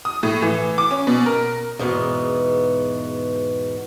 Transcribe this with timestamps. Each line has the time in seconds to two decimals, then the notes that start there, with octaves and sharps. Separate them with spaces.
0.05 D#6
0.23 A2
0.42 E3
0.78 D6
0.91 C#4
1.07 B2
1.26 A#4
1.79 E2 G#2 B2 B3